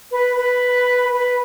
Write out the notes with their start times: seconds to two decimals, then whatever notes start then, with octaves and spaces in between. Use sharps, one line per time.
0.11 B4
0.36 B4
1.13 B4